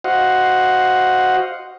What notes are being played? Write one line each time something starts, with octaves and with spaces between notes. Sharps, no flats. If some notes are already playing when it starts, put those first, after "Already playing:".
F#4 C5 D#5 F5 F#5